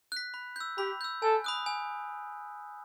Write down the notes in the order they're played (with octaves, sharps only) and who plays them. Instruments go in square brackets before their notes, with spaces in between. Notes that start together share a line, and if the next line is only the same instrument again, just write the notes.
[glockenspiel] F#6 B6
B5
E6 G6
[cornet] G4 [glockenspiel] B5
[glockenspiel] E6 G6
[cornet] A4 [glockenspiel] G#5
[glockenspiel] B5 D#6 F#6
G#5